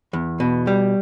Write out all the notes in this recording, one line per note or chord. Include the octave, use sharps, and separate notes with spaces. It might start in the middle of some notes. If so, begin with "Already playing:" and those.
E2
B2
G3